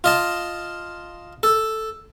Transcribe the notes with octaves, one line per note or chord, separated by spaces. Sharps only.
F4 D#5 A5
A4